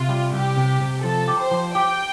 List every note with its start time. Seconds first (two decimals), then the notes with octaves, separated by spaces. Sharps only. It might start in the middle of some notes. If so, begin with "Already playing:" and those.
Already playing: C3 F4
0.09 G3
0.32 C2 G4
0.57 C3
0.80 C3
1.03 F3 A4
1.28 G4
1.39 C5
1.51 F3
1.75 G4 G5